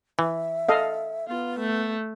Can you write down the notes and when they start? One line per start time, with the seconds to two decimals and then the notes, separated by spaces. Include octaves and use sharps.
0.19 E3 E5
0.68 A4 D#5 F5
1.28 B3 F4
1.60 A3